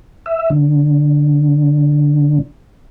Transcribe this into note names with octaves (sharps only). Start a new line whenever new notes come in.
E5
D3